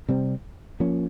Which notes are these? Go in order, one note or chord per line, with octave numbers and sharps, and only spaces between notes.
C3 G3 C4
F3 A#3 C#4